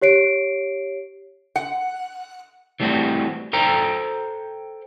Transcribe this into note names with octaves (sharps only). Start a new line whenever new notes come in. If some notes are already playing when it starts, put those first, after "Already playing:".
G4 C#5 C7 D7
F#5
E3 G3 A3 B3 C4 F#4
A4 C5 G5 A#5